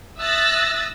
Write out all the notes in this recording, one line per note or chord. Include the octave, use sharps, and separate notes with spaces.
E5 D#6 E6 F#6 A6 A#6